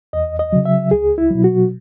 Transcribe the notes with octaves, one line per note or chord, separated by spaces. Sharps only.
E2 D#5
D#5
C#3 F#3
E5
C#2 G#4
E4
B2 F#3
F#4